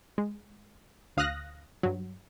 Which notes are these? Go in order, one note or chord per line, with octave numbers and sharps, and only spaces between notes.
G#3
D2 F5 D#6 F6 F#6 A#6
G2 F#3